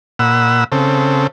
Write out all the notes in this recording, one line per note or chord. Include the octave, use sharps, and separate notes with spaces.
A#2 F#5 B5 E6
C#3 C4 A4